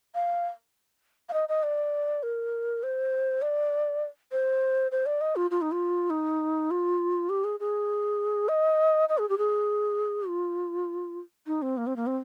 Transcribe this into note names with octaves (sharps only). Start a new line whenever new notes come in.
F5
F5
D#5
D#5
D5
A#4
C5
D5
C5
C5
D5
D#5
F4
F4
D#4
F4
D#4
F4
G4
G#4
G#4
D#5
D#5
G#4
G4
G#4
F4
D#4
C4
A#3
C4
A#3
C4